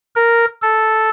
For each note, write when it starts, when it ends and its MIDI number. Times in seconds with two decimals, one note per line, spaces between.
0.16 0.45 70
0.62 1.10 69